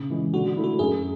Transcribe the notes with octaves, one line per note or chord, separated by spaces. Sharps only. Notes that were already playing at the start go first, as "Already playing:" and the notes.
Already playing: C#3
E3 G#3
D3 F#4
A3 E4
F#4
F#2 G#4